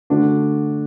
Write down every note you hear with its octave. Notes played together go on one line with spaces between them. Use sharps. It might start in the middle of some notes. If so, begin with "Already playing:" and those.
D3 A3 D4 F#4